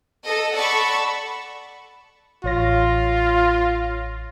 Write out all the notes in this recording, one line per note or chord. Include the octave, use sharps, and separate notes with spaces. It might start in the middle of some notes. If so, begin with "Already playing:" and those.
A4 D#5
A4 D5 F#5 A5 B5 C#6
A1 F4 C#5 A#6